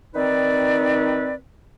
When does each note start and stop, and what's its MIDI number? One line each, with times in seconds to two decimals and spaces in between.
0.15 1.34 51
0.15 1.34 60
0.15 1.34 63
0.15 1.34 71
0.15 1.34 74